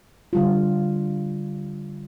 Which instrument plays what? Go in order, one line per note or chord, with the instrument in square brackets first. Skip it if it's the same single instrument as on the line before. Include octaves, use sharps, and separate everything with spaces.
[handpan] D3 G3 F4